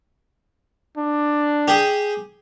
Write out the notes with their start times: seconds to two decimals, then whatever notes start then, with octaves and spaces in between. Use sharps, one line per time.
0.97 D4
1.68 G4 G#4